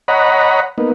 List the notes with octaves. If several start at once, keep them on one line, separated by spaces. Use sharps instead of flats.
C#5 D#5 F#5 A#5 B5
A#3 B3 D#4